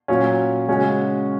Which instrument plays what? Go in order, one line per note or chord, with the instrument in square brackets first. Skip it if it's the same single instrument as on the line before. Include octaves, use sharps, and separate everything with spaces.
[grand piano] A#2 F#3 C#4 F4
C#3 G#3 C#4 F#4